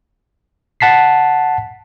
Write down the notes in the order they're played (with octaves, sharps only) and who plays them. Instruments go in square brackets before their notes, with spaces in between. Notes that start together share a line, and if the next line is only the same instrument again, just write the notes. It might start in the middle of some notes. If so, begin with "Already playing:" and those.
[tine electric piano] F#5 A5 B6 C7